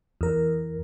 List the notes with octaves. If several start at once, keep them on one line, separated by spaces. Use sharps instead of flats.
E2 A#4